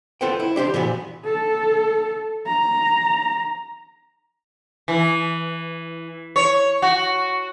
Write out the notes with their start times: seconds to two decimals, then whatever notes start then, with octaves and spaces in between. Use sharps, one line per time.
0.21 F4 A4 B4 C5 F#5 G5
0.40 E4
0.56 D4 G4 C5 C6
0.74 A#2 E3 G3 B3 F#4
1.25 A4
2.47 A#5
4.88 E3
6.36 C#5
6.82 F#4